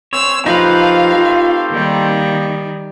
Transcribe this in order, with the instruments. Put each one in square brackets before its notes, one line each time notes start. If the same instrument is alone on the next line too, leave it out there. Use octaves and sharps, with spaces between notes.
[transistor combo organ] C4 [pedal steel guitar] C#5 [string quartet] E6
[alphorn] F3 [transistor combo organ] A3 C4 G4 [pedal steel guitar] D#4 B4 [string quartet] F5
[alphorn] F4
[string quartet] D#3 G3 [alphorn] A#3